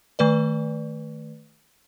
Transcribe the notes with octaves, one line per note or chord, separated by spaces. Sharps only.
D#3 A3 B4 D5